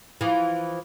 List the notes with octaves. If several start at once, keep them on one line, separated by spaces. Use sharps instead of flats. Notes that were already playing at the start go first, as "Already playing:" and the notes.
E3 F3